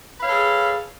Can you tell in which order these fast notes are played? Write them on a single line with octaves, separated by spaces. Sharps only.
B4 F5 C#5 A4 G#4